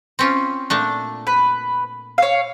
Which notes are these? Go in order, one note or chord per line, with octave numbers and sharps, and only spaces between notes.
C4 C#4 F4
A#2 A3 D4
B4
C#5 F5